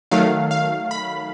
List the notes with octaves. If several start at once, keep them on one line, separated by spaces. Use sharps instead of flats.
D#3 F#3 A3 F5
F5
B5